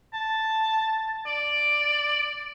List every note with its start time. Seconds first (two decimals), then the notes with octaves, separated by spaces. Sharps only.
0.13 A5
1.26 D5